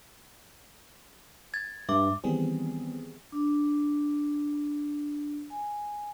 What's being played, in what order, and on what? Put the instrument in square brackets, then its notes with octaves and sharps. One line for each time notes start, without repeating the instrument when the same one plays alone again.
[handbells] G#6 A6
[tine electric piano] G2 [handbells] E5 D6
[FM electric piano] D#3 E3 G3 B3 C4 G#4
[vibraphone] D4
G#5